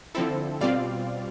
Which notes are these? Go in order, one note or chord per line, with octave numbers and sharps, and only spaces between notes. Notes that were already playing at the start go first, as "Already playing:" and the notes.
D3 F3 C4 E4 A4
B2 G3 C4 F4 D5 F5